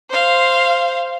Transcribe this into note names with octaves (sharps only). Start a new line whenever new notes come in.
C5 F5